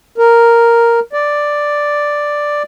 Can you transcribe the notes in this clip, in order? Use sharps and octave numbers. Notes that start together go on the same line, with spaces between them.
A#4
D5